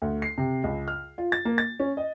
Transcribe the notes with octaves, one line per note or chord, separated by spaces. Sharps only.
D2
C7
C3
C#2
F6
F4
A6
A#3
A6
C#4
D#5